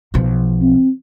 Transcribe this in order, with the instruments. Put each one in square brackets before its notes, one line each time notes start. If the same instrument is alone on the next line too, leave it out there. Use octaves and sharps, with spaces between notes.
[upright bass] B1 F3
[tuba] C4